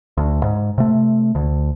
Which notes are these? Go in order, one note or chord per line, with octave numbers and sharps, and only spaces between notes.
D2
G#2
C3 A3
D2